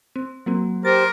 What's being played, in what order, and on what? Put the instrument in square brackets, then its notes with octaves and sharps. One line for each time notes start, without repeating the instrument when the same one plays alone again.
[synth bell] C4
F#3 A#3 C4
[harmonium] G4 C5 [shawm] A#4 [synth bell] A6